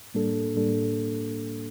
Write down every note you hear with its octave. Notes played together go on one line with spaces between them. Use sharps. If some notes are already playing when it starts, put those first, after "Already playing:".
A2 G3 A#3 D4 A4
A2 G3 A#3 D4 A4